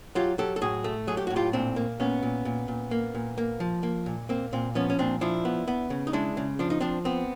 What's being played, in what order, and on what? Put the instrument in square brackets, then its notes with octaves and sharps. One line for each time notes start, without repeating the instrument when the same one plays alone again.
[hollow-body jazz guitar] F#3 F4 G4
F#3 G4 A4
A4
A2 F#4 G#4
A3
F#3 G#4
G4
A2 F#4
F4 G4
A#2 C4 D4
A#3
A#2 B3 C#4
A#2
A#2
A#2
A#3
A#2
A#3
F3
A#3
A#2
A#3 C4
A#2 C4
F3 B3 C#4
C#4
A#2 C4 D4
F3 D4 E4
B3
B3
C#3
D#4
G#3 D4 E4
C#3
F3 D4
D#4
F3 C4 D4
B3 C4